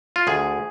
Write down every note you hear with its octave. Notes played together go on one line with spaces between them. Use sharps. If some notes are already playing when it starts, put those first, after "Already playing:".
F4
D2 G#4